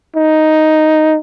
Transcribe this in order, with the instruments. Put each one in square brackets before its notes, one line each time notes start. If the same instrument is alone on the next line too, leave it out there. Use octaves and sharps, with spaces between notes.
[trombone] D#4